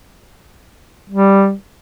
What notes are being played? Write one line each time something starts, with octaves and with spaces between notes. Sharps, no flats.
G3